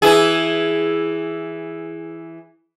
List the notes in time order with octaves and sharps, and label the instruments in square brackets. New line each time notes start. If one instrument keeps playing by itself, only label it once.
[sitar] E3 E4 G#4